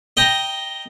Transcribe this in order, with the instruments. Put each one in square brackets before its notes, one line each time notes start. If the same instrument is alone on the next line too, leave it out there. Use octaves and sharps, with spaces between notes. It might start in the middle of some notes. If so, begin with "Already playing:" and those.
[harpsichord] D#5 G5 A#5